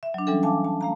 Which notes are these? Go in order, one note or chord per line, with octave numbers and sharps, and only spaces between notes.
E5
F#3 D4
E3 G3 C#4 A4
F5 G#5 A5 D6
A5
A3 F5 A#5